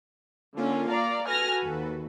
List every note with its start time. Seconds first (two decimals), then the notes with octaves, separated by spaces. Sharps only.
0.57 D3 A#3 C#4 F4
0.90 D5 F5 A#5
1.26 F#4 A4 B4 G#5 F6 A#6
1.64 D#2